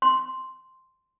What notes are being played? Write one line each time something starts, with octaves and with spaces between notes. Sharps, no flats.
C6